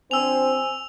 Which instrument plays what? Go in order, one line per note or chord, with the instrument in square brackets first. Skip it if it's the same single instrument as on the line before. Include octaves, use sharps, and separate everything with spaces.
[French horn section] F3 D4 C5 [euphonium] C4 [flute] G#5 [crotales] E6 F7